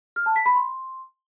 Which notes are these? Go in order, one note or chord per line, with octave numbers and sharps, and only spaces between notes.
F6
A5
B6
B5
C6